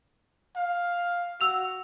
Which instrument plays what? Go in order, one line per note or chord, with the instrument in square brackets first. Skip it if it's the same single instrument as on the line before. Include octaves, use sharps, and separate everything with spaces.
[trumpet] F5
[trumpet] F#4 [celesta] E6 F7